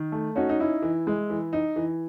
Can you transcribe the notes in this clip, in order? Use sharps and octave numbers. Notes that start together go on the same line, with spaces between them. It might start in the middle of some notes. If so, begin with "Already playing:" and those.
Already playing: D#3
A3
C#4 D#4 F#4
D#4
D#4 E4
E3
G#3
E3
D#4
E3